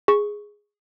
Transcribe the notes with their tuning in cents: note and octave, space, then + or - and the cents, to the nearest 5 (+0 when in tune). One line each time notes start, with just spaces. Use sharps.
G#4 +0 C#6 +0